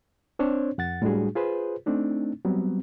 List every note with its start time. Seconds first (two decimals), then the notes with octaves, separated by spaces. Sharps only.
0.39 C4 D4 C5 C#5
0.78 F2 F#5 A6
1.02 A2 G3 G#3 D4 F#4 G#4
1.35 F4 G#4 B4 C5
1.86 A3 C4 D4 D#4
2.45 F#3 G3 B3 C4